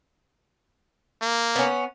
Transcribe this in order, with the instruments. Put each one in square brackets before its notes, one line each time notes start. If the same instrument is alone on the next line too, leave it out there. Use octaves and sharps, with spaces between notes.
[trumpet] A#3
[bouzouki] B3 C#4